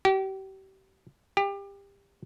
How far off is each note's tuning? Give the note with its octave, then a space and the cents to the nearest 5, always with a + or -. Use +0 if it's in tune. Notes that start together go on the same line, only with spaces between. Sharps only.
G4 -35
G4 +25